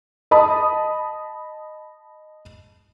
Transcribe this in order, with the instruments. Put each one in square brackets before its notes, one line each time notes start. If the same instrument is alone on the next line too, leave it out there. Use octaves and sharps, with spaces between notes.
[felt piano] D#5 A5 B5 D#6